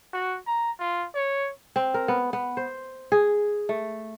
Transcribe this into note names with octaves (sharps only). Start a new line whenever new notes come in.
F#4
A#5
F4
C#5
C4
A#4
B3
B3
C5
G#4
A3